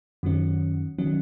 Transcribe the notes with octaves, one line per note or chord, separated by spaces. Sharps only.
F#2 D#3 F#3 C#4
D#3 F#3 C#4